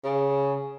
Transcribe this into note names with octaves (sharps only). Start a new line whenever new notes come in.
C#3